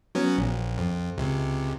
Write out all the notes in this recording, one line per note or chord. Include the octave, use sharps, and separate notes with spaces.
F#3 B3 C#4
A#1
F2
C#2 C3